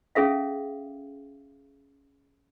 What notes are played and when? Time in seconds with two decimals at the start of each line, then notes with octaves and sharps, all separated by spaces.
0.15 C#4 G#4 A4 E5 F5